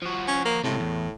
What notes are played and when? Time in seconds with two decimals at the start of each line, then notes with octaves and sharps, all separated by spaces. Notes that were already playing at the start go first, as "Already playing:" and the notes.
0.02 F3 F#4
0.28 C#4
0.45 A#3
0.64 C#2 A2 C3
0.80 E2